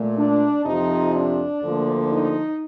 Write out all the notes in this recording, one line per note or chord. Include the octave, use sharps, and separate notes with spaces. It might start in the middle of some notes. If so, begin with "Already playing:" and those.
Already playing: A#2 A3
D4
F2 C3 F3 D#4
D4
D2 D3 F3 A#3
D#4